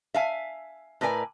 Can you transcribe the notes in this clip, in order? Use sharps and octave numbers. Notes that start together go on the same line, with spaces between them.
E5 F5 G#5
A2 A#4 B4 D5 G#5